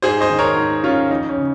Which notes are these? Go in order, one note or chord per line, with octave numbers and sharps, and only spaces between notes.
G#2 G#4 C5
C5 D#5
D#3
A#4 C#5
G#2
D#3 C#4 F4
F2 D#4
C#4
C#3